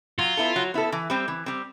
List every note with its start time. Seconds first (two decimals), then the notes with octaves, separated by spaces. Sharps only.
0.19 F#3 F4
0.37 B3 E4 A4
0.56 F#3
0.74 B3 E4 A4
0.92 E3
1.10 G3 C4
1.28 E3
1.46 G3 C4